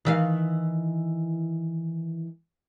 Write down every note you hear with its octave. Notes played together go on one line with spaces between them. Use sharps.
D#3 E3 F5